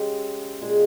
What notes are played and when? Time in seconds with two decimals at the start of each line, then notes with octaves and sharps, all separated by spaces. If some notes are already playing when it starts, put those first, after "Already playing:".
Already playing: C#3 G#3 G4
0.61 A#2 G#3 G#4